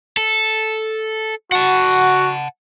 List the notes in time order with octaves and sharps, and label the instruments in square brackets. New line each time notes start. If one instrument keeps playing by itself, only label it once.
[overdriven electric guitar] A4
[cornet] F#4 [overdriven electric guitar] F#5 A5